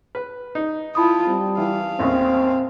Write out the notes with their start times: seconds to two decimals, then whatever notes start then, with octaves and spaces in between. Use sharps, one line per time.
0.15 B4
0.55 D#4
0.95 E4 F4 A5 B5 D#6
1.27 G3 C4
1.58 E3 F5
1.99 A1 D#2 C4